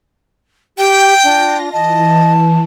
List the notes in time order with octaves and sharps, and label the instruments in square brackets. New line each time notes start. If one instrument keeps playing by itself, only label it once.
[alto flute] G4 [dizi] G5
[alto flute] D4 [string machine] F4 A#6
[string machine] E3 [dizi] D#5 [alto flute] A5